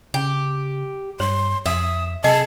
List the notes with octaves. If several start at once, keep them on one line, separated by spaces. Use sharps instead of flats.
C#3 G4
G2 C#5 C6
F2 E5 D#6
C3 G#4 D#5 A5